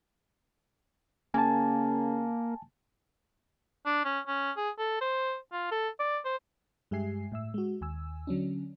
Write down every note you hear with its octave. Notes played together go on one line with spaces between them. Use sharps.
C#3 A#3 G#5 A5
D4
C#4
C#4
G#4
A4
C5
F4
A4
D5
C5
G2 G#3 G4 E5 G#5 C7
A2 E5 E6
G#3 F#4
D#2 G#5 E6
D3 F#3 C#4 D4